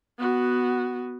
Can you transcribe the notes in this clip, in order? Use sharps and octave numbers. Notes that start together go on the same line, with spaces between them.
B3 F#4